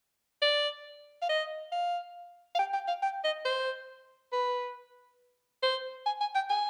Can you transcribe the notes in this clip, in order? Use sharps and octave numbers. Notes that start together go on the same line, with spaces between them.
D5
F5
D#5
F5
F5
G5
G5
F5
G5
D#5
C5
B4
C5
G#5
G#5
G5
G#5